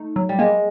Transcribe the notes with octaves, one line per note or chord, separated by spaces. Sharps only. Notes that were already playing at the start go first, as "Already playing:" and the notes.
Already playing: A3 D#4
F#3
G3
G#3 A#3